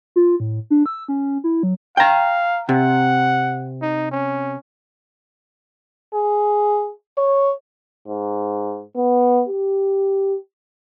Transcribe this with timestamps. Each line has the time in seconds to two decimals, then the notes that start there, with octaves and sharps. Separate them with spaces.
0.16 F4
0.40 A2
0.70 D4
0.86 E6
1.08 C#4
1.44 E4
1.63 F#3
1.97 F5 G5 A#5
2.69 C3 F#5
3.82 D#4
4.11 C#4
6.14 G#4
7.18 C#5
8.07 G#2
8.96 B3
9.48 G4